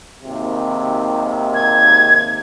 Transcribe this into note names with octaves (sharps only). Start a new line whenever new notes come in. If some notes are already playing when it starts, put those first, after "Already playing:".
G#1 D#2 C3
G#6